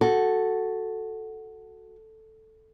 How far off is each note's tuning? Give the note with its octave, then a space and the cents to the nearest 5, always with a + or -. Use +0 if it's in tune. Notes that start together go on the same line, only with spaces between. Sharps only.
F#4 +0 A4 +0